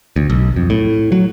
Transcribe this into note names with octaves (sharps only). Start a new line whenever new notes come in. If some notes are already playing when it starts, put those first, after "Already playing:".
D2
B1
F2
A2
F#3